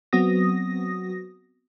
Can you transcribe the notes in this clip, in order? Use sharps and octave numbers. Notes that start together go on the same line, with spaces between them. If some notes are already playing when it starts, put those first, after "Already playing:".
F#3 B3 C4 F#4 D#6 A#6